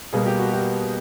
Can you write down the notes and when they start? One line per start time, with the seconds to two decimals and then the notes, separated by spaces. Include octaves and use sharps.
0.13 B2 G3 A#3 G#4
0.26 G4
0.39 F#4
0.53 G4